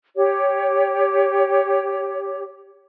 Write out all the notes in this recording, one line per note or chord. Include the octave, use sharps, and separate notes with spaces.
G4 C#5